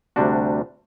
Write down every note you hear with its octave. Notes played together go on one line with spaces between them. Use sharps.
D2 C3 G3 D4 F#4